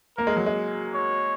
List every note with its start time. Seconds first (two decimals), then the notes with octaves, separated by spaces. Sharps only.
0.17 A#3 A#4
0.27 G#3
0.36 F#3
0.46 G#3
0.94 C#5